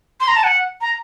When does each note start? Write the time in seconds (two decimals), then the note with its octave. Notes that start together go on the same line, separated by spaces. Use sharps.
0.20 C6
0.28 A#5
0.36 A5
0.44 F#5
0.81 A#5